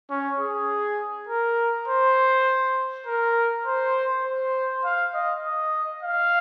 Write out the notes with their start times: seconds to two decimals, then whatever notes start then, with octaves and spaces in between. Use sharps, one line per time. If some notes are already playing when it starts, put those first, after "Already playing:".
0.10 C#4
0.40 G#4
1.29 A#4
1.88 C5
3.06 A#4
3.66 C5
4.25 C5
4.84 F5
5.14 D#5
5.43 D#5
6.03 F5